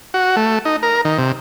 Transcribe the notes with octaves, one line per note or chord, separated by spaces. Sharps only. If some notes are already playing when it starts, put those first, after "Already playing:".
F#4
A3
D#4
A#4
D#3
C3